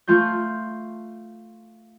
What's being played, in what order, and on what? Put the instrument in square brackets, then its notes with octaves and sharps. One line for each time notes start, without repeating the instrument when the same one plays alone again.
[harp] A3 F4 C6 G6